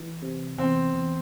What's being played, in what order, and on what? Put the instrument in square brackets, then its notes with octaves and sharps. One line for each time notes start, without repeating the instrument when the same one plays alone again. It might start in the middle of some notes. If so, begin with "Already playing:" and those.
Already playing: [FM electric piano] E3
C3
[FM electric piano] E2 [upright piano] C4
[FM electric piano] E2